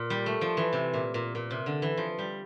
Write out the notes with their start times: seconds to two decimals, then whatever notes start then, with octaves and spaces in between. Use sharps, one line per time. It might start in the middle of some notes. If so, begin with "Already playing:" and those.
Already playing: A#2
0.10 G3
0.26 A3
0.41 F3
0.57 E3
0.73 C3
0.93 A#2
1.14 A#2
1.35 A#2
1.51 C3
1.66 D3
1.82 E3
1.97 F3
2.19 G3